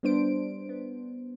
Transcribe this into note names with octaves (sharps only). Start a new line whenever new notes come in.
G3 B3 D4 C5 D7
B3